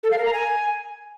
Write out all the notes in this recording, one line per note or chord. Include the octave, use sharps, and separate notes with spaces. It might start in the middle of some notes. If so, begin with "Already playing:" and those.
A4
F5
A#4
A#5
G#5